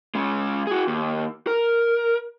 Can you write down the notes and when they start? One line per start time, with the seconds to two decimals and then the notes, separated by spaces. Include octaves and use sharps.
0.15 G#3 C#4
0.67 F#4 G#4
0.87 D#2
1.47 A#4